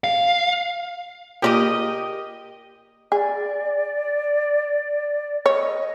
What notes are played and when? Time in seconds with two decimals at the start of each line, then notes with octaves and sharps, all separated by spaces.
0.04 F5
1.42 A#3 F4 G4 G#4 A#4 D5 D#5
3.12 G#4 D5
5.46 C#5 D#5